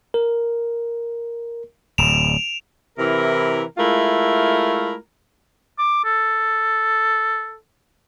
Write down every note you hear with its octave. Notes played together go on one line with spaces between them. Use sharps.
A#4
D1 D7 E7 F7
C3 E3 E4 A#4
G#3 A3 E4 F4 A#4
D6
A4